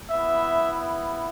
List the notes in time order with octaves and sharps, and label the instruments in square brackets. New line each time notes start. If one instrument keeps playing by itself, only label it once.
[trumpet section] B3 E4 E5